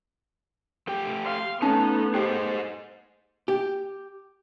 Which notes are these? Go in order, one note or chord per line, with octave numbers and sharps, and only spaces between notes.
A3 G4 G5
F5 C6
A3 B3 C#4 D#4 A5
G4 G#4 C5 D#5
G4